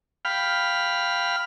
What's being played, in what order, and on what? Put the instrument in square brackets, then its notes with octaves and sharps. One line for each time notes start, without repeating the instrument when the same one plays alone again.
[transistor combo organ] F5 G5 B5 F6